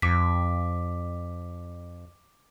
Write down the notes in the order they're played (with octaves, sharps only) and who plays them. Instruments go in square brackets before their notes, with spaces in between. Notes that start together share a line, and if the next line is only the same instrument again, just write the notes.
[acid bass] F2 [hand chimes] D6 B6